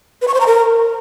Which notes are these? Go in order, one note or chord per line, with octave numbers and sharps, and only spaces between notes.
B4
C#6
C5
A#5
A#4